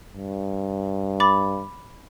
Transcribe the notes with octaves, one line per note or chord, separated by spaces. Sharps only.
G2
B5 D6 A6